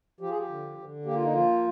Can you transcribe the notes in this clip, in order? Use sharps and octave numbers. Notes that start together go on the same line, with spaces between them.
F3 G4
G#4
G4
D3
D3
A#3 G4
F4
D#4
F3 F4